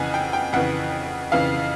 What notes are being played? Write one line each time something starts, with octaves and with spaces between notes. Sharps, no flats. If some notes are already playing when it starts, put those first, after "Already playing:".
Already playing: F2 C#3 E3 F#5 G#5
G5
G5
F2 C#3 E3 F#5
F2 C#3 E3 F5